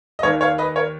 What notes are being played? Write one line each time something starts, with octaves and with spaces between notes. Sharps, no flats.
D#5
D#2 D#3 C#5 F5
C#5 F5
B4 D#5
A#4 C#5